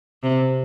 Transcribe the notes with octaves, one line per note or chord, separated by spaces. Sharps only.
C3